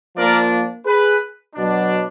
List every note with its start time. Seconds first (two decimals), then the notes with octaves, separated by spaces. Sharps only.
0.16 F3 A#3 D4 A#4 D5
0.86 G#4 B4
1.55 B2 F#3 D4